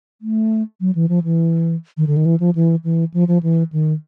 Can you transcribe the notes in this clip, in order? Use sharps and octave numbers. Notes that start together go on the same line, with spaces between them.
A3
F#3
E3
F3
E3
D#3
D3
D#3
E3
F3
E3
E3
F3
F3
E3
D#3